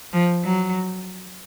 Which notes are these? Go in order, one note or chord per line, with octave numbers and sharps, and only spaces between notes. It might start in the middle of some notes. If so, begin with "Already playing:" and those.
F3
F#3